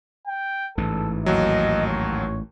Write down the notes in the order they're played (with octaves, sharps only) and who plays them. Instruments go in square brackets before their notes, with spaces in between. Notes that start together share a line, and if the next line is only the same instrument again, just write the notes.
[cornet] G5
[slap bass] A1 G#2 E3 [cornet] A4
[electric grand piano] D#2 F#3 [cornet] D#5
[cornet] C#5